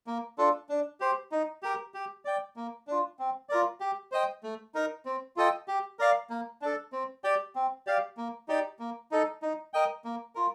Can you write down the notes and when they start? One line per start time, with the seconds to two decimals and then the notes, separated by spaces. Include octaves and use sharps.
0.07 A#3
0.38 D4 F4 A4
0.69 D4
1.00 G4 C5
1.32 D#4
1.63 G4 A#4
1.94 G4
2.25 D5 G5
2.56 A#3
2.87 D4 F4
3.19 C4
3.49 F4 A#4 D5
3.80 G4
4.12 C5 D#5 G5
4.43 A3
4.75 D#4 A#4
5.05 C4
5.36 F4 A4 D#5 G5
5.68 G4
5.99 A#4 D5 F5
6.30 A#3
6.62 D4 A4
6.92 C4
7.24 G4 D5 G5
7.56 C4
7.87 G4 D5 F5
8.17 A#3
8.48 D#4 G4 D5 G5
8.79 A#3
9.12 D#4 A4
9.42 D#4
9.73 A#4 D#5 G5
10.05 A#3
10.35 F4 A#4